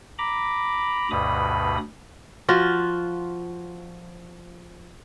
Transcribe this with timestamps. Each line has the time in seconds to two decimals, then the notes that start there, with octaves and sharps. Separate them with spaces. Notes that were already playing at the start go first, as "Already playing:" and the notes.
0.18 A#5 B5 D6
1.11 D2 G2 B2 B5 D#6
2.49 F3 F4 F#4